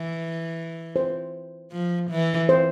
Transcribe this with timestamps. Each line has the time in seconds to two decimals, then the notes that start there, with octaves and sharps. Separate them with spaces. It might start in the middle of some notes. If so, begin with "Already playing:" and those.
Already playing: E3
0.96 C5
1.72 F3
2.11 E3
2.49 C5